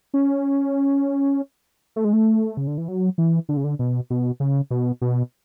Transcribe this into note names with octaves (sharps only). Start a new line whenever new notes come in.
C#4
A3
G#3
A3
C#3
D3
E3
F#3
E3
D3
C#3
D3
B2
B2
C#3
B2
B2